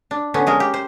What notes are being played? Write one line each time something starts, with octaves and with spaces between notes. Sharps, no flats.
D4
D3 B3 C#4
G#3 G#4 A#4
G4
C5